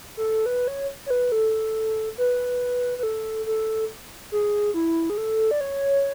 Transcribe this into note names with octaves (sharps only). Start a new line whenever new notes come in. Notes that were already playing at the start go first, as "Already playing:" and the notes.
A4
B4
C#5
C#5
B4
A4
B4
B4
A4
A4
G#4
E4
G#4
A4
D5
C#5